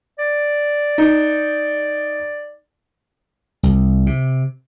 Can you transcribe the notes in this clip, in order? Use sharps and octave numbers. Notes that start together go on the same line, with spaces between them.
D5
D#4
C2
C3